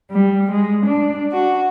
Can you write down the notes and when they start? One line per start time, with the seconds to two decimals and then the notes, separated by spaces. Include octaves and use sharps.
0.11 G3
0.52 G#3
0.87 D4
1.31 F#4